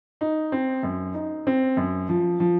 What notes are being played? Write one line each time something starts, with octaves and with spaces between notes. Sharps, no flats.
D#4
C4
F#2
D#4
C4
F#2
F3
F3